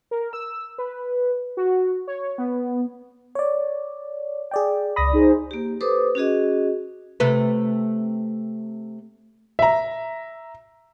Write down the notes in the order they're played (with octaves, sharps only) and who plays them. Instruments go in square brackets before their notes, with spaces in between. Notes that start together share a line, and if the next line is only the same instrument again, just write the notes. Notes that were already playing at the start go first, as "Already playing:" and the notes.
[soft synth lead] A#4
E6
B4
F#4
C#5
B3
[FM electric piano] C#5 D5
G#4 D5 G5
[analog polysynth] C#2 D5 [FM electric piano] B5 D#6 A#6
[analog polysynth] D#4 G#4 C5
[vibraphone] A#3 G4
G4 A4 B4 C5 D6 D#6
C#4 F#4 G#4 D#5
[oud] C3 A3 B4
[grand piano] E5 A#5